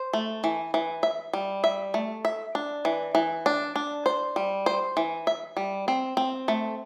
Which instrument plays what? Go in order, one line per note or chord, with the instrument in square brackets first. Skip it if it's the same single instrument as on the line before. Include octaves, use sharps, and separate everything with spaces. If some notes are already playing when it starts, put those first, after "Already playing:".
Already playing: [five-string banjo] C5
A3
E3
E3
E5
G3
E5
A3
E5
D4
E3
E3
D4
D4
C5
G3
C5
E3
E5
G3
C4
C4
A3